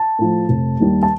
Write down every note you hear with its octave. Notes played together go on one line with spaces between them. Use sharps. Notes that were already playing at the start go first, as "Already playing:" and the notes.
Already playing: A5
A2 F3
F1
D#2 D#3 G3
A5